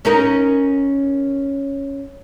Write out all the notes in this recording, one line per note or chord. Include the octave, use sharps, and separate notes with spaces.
C#4 D#4 A#4